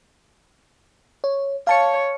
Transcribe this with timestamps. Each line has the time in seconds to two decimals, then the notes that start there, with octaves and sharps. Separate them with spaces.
1.24 C#5
1.67 C#5 F5 A5 C#7